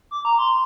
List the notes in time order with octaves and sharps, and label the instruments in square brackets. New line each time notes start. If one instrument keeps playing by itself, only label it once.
[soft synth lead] D6
A#5
C6